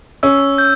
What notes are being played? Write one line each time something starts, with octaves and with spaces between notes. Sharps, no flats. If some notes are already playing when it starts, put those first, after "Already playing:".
C#4 E6
G6